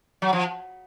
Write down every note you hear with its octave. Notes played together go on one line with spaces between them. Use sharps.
F#3
F3